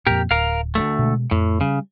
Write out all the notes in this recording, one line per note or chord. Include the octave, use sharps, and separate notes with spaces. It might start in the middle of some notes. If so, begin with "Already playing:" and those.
F2 A#2 G4 A#4
D1 A#4 F5
D2 G2 A3
B2 G#3
F2 A2
C#3 G3